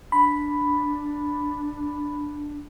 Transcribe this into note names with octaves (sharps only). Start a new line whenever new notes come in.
D4 B5